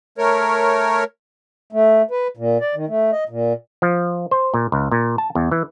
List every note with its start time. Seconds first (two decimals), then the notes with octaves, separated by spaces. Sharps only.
0.18 A3 A#4 C#5
1.72 A3
2.11 B4
2.37 A#2
2.61 D5
2.75 D#3
2.88 A3
3.13 D#5
3.29 A#2
3.82 F3
4.31 C5
4.54 A#2
4.72 C#2
4.91 A#2
5.18 A5
5.35 E2
5.51 E3